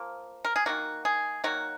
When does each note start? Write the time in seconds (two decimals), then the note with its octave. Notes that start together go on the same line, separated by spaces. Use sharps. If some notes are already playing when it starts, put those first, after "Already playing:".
Already playing: F3 A#3
0.45 A#4
0.56 G#4
0.66 D#3 F#3 A#3 F#4
1.05 G#4
1.44 D#3 F#3 A#3 F#4